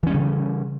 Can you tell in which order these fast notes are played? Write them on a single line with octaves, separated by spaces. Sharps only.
E3 C#4 G3 C#3